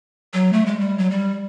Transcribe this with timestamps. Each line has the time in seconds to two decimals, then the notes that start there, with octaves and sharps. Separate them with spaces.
0.34 F#3
0.53 A3
0.66 G#3
0.80 G3
0.98 F#3
1.11 G3